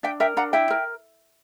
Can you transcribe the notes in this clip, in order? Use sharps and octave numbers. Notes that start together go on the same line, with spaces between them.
D4 E5 G5
A#4 E5 G5
D4 F#5 A#5
E4 E5 G5
A#4